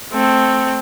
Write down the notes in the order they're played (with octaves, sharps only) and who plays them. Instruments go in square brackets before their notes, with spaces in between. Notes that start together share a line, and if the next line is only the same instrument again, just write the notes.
[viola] A3 C4